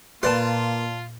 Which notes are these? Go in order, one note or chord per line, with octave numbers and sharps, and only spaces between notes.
A#2 A#3 F4 B4 D5 A5 C6